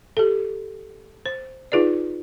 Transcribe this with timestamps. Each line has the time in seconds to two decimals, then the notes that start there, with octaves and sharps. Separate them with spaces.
0.17 G4 A4
1.26 C5
1.72 D#4 F4 G#4 B4 D5